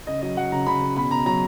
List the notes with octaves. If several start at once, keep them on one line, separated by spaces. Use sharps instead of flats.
C#3 D#5
F#3 D#5
F#3 F#5
C#3 A#5
C#3 B5
C#3
B2 B5
B2 A#5
F#3 A#5